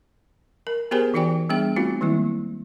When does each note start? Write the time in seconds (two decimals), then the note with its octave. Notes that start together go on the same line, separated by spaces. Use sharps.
0.67 A#4
0.91 B3 G4 G#4 A#4 C5 G#5
1.14 E3 D#4 F#4 D5 G5 G#5
1.49 G3 B3 D4 G#4 G5
1.76 A3 C4 D#4 F4 F#4
2.01 D#3 F#3 G3 A#3 E4